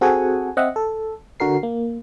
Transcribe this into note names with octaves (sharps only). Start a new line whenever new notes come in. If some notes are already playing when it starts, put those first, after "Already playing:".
C4 F#4 G#4 A4 F#5 G#5
C4 D#5 E5 F#5
A4
D3 F#4 A#4 C7
A#3